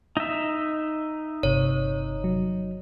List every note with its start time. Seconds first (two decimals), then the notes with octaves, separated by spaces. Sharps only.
0.17 D#4 E5
1.43 G1 C3 C#5
2.24 F#3